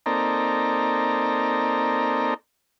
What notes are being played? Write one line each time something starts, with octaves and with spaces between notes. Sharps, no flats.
A#3 C4 D#4 A4 D5 A#5